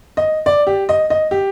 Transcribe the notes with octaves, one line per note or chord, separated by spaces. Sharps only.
D#5
D5
G4
D#5
D#5
G4